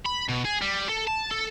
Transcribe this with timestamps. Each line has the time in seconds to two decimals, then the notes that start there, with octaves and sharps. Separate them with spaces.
0.05 B5
0.29 B2
0.45 G#4
0.62 G3
0.89 A4
1.07 A5
1.31 A4